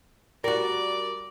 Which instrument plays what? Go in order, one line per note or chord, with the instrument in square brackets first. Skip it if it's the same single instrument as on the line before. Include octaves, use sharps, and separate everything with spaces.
[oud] G3 F#4 [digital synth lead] A#4 [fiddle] D5